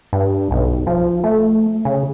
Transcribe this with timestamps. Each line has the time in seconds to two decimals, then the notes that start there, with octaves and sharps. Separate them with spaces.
0.13 G2
0.51 B1
0.87 F3
1.24 A3
1.85 C#3